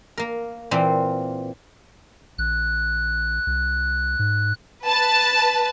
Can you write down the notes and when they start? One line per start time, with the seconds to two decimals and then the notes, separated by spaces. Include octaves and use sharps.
0.18 A#3 A#4
0.71 A#2 E3 A#3 C4
2.38 A#1 F#6
3.47 C2
4.19 G#2
4.85 B4 A5